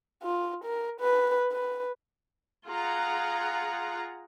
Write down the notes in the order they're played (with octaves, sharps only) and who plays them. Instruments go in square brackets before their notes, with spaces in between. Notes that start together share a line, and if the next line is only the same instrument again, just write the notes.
[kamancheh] F4
A#4
B4
B4
[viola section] F4 G#4 F#5 A#5